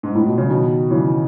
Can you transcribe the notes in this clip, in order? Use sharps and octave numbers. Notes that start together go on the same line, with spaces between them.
G#2
A2
B2
C#3
B2 D#3
C#3 E3